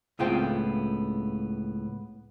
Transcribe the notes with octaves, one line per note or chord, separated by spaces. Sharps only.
C#2 A2 B3 C4 F4 G5